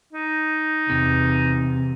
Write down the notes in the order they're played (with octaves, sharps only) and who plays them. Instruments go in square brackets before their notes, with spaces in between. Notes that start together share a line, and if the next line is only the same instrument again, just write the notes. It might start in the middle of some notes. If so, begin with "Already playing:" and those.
[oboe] D#4
[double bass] E2 [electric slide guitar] C3